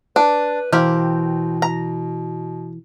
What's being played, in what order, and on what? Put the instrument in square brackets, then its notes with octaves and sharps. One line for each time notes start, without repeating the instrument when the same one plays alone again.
[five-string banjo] D4 [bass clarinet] B4
[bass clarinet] B2 [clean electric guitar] E3 [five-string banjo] A#3 C4 G4
[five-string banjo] A#5